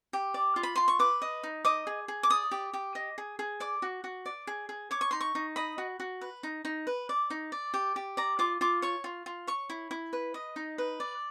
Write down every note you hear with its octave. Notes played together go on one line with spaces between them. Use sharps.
G4
D5
F4
B5
F4 C6
C#6
B4 D6
D#5
D#4
D#5 D6
G#4
G#4
D6
D5 D#6
G4
G4
D#5
G#4
G#4
D5 D6
F#4
F#4
D5
G#4
G#4
C#5 D6
C#6
D#4 C6
C#6
D#4
D#5 B5
F#4
F#4
B4
D#4
D#4
B4
D5
D#4
D5
G4
G4
D5 A#5
F4 D6
F4 D6
C#5 C#6
F4
F4
C#5 C#6
E4
E4
B4
D#5
D#4
B4
D5